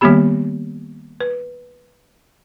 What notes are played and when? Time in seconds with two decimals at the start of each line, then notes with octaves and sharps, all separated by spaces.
0.01 D#3 G3 A#3 B3 G4 B5
1.21 B4